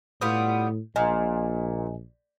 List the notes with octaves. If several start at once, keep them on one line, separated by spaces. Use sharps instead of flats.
A2 G3 B3 F4 D#6
A#1 A#2 D#5 G#5